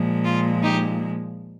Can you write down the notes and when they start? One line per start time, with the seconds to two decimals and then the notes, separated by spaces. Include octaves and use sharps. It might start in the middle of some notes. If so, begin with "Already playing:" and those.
Already playing: A#2 F3 G#3
0.24 F4
0.63 D#4 G4